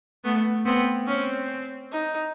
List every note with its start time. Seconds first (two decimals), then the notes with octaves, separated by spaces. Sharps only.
0.24 A3 B3
0.65 B3 C4
1.07 C4 C#4
1.92 D#4